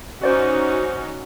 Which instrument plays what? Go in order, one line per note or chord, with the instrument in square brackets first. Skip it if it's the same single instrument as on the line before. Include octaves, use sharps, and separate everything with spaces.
[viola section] C#4 D#4 F#4 [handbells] C5 D5